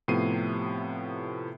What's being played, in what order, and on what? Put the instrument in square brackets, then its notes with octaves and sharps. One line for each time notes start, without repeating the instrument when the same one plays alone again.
[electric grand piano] A2 C3 F3 B3 C7 D#7